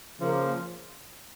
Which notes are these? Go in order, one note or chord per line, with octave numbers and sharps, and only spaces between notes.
C#3 F3 A#3